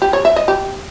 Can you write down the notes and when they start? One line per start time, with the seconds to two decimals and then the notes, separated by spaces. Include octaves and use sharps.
0.02 G4
0.13 C#5
0.25 E5
0.36 D#5
0.48 G4